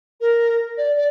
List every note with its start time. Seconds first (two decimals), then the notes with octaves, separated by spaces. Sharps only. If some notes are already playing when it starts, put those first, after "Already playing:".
0.21 A#4
0.77 D5
0.96 D5